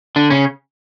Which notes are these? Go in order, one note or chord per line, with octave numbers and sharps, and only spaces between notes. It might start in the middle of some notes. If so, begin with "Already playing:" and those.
D3 D4
C#3 C#4